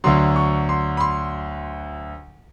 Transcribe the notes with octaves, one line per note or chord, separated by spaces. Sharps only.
D2 D3 F#3 C6
C#6
C6
B5
C6